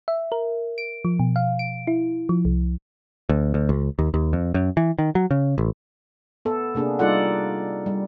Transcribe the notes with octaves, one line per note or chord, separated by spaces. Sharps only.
E5
A#4
D7
F3
B2
F5
D7
E4
F3
C2
D2
D2
C#2
D#2
D#2
F2
F#2
E3
D#3
F#3
C#3
A1
B3 A4
C3 A#3 D4 G#4
G3 D#4 F4 A4 D5 F#5
G3